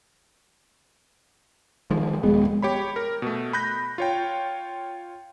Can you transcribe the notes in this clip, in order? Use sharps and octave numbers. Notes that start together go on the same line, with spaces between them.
D#3 F3 G#3
D#1 G#3 B3
G4 C#5 B5
A#4
B2 A3
B5 F#6 G6 A#6
F4 C#5 G5